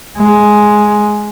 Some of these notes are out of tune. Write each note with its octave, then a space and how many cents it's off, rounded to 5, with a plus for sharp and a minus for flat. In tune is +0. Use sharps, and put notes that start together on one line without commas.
G#3 +5